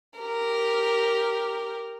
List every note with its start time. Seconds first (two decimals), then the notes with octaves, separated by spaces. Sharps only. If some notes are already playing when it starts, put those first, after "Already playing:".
0.19 G4 A#4